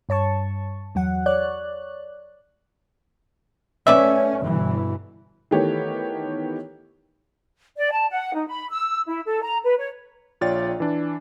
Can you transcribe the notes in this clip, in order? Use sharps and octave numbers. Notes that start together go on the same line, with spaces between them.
G2 C#5 A5 C#6
E2 F#3 F#5
C#5 D5 F#6
A3 C#4 B4 D5 E5
G1 B2 E3
D#3 E3 A3 B3 G4 C#5
D5
A5
F#5
D#4
B5
E6
E4
A4
A#5
B4
C#5
A#1 F4 C#5 D5 G5 A6
E3 D4